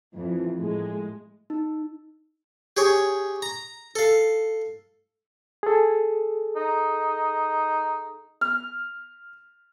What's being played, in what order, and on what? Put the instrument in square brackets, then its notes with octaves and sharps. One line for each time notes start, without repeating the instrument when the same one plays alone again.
[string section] F2 E3
A2 G#3
[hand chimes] D#4
[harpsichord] G4 G#4 C#5
A#5
A4 F5
[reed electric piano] G#4 A4
[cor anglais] D#4
[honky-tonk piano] F6